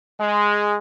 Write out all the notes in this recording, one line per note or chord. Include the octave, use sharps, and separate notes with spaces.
G#3